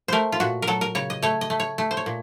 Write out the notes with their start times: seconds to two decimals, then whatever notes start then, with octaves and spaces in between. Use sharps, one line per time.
0.08 A3 A#4 C5
0.32 F4
0.40 A#2 F#4
0.62 A#4
0.67 F#3 A4
0.81 A#4
0.95 C#3 C#5
1.10 D#5
1.22 A3 C#5
1.41 D#5
1.50 A3
1.60 C#5
1.78 A3
1.91 C5
1.97 C#5
2.06 A#2